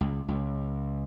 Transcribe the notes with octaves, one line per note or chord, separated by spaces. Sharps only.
C#2
C#2